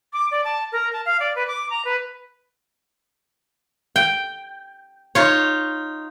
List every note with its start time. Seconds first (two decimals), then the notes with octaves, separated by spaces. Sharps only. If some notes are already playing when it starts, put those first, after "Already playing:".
0.13 D6
0.31 D5
0.45 A5
0.72 A#4
0.93 A5
1.06 F5
1.20 D5
1.36 B4
1.48 D6
1.70 A#5
1.85 B4
3.96 G5
5.15 D#4 F4 C#5